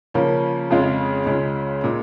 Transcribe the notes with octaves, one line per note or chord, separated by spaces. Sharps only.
C#3 F3 A#3 C#4
F2 C#3 G#3 F4 G#4
C#2 C#3 G#3
A#2 G#3